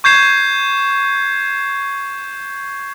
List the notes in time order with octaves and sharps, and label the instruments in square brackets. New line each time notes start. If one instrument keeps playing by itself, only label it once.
[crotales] C#6 G6 G#6 C7 E7